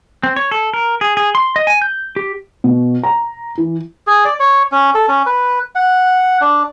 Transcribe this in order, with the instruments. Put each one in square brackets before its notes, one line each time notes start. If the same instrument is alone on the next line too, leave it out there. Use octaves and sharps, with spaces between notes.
[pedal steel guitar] C4
C#5
A4
A#4
G#4
G#4
C6
D#5
G#5
G6
G4
[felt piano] B2
A#5
E3
[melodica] G#4
D5
C#5
C#4
A4
C#4
B4
F#5
D4